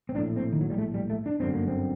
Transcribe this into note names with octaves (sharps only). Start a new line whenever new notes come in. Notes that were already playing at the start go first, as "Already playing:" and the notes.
C4
A#1 A2 D4
C4
D#3
F#3
G3
A3
G3
A3
D4
G1 F#2 D3 C4
A#3
C4